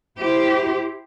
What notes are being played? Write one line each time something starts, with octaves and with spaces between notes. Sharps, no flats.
E4 G4 C5